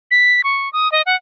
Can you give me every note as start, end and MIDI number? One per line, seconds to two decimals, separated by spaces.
0.11 0.41 95
0.44 0.71 85
0.73 0.91 87
0.92 1.02 75
1.06 1.16 78